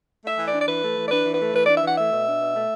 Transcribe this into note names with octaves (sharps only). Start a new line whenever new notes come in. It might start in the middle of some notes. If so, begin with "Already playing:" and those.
A3 E5
E3
D5
D4
D5
E3 B4
A3
E3
D5
D4 B4
E3
B4
A3
E3 B4
D4 D5
E5
E3 F#5
A3 E5
B2
D4
B2
A3